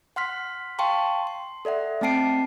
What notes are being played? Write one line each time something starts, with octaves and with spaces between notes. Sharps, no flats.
F#5 C6 F6 B6
F5 G5 A5 C6 C#6
C6
A4 D5 E5 F#5
A3 C4 G5 A5 C7 D7